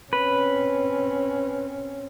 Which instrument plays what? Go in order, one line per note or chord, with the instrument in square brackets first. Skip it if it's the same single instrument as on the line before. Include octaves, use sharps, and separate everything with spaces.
[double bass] C4 C#4 [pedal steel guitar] B4